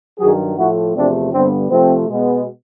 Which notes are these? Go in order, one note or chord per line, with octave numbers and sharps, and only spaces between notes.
G2 D#3 F#3 F#4 G#4
A2 F3 A3 E4 F#4
E2 C3 F3 A3 C4 D4
G2 D3 G3 B3 C4
C3 F3 A3 C4
B2 G#3 B3